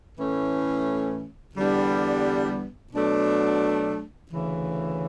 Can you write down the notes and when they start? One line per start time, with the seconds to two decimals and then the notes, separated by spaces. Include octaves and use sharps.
0.18 A2 E3 A3 C#4
1.56 E2 D3 G3 B3 D4
2.93 B2 F#3 A3 D4
4.32 D2 C#3 E3